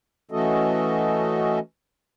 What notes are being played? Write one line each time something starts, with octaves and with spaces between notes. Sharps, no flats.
E3 A3 C#4 F#4 A4 D#5